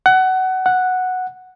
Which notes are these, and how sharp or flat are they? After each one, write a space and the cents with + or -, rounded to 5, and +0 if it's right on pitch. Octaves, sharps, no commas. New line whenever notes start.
F#5 +20
F#5 -5